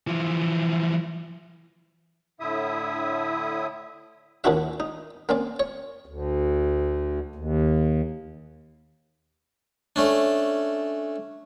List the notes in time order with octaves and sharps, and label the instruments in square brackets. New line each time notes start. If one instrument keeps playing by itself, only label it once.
[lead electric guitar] E3 F3
[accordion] A2 D3 E4 E5 D#6
[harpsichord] D#2 A#2 D4 E4 F#4 E5
D#4
A#3 C4 C#4 D5
C#5
[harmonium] D2
D#2
[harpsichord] A3 C#4 D4